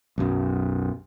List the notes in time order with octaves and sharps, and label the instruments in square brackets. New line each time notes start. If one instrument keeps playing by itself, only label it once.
[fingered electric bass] B1 F#2